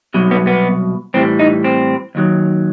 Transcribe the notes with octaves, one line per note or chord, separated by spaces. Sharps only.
C2 B2 F#3
B3
B3
A2 E3 G3 C4
D#4
C4
D#2 D#3 F#3